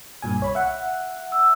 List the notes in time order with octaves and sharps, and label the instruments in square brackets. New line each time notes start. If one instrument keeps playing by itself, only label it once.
[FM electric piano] G2 A#2 G#5
C2 C#5 B5
E5 F#5
[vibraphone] E6